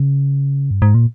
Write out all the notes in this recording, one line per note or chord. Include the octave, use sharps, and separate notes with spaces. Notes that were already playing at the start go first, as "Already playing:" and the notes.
Already playing: C#3
G2
G#2
A#2